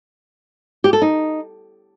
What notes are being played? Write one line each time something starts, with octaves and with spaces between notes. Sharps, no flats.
G4
A4
D#4